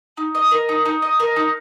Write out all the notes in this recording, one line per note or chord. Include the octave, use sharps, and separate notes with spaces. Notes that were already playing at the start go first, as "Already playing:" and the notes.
D#4
D#5
A#4
D#4
D#4
D#5
A#4
D#4